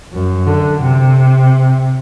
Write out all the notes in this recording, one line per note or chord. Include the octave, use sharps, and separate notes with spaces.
F#2
D3
C3